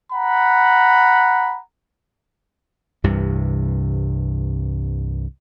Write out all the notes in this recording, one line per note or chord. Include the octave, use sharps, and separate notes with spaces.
F#5 A#5 B5
C2 G2 C3 E3